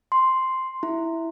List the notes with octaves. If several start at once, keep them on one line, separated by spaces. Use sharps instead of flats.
C6
E4